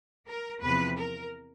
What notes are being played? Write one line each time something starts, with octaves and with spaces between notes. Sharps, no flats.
A#4
E2 C3 F3 B4
A#4